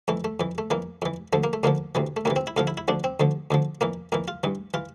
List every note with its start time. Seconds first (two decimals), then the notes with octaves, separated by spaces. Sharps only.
0.08 F2 E3 A3
0.24 A3
0.40 F2 E3
0.58 A3
0.71 F2 E3 A#3
1.02 F2 E3
1.33 D2 D3 F3 A3
1.44 A#3
1.53 A3
1.63 D2 D3 F3 A#3
1.95 D2 C3 E3
2.17 A3
2.25 D2 C3 E3 A#3
2.36 C4
2.47 E4
2.57 D2 D3 F3 F4
2.67 E4
2.77 E4
2.88 D2 D3 F3 D4
3.04 C4
3.20 D2 D3 F3
3.51 D2 D3 F3
3.81 F2 E3 A#3
4.12 F2 E3 A#3
4.28 F4
4.44 G2 E3
4.74 E3 F4